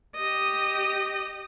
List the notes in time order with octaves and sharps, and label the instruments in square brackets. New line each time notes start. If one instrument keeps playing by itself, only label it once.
[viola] G4 D#5